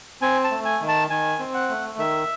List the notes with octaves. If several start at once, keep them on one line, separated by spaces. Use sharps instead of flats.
C4 G#5
A5
A3
G#5
D#3
A5
D#3 G#5
C4
F#5
A3
D#3 E5